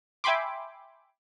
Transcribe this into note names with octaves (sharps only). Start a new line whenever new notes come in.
E5 G5 G#5 B5 C6 D6